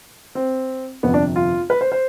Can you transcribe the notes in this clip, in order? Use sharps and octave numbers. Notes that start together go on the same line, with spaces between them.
C4
G1 F2 C3 B3
D4
F4
B4
C5
C5